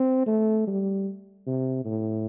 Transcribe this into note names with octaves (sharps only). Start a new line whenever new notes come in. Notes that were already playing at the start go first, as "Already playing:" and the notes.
Already playing: C4
A3
G3
C3
A2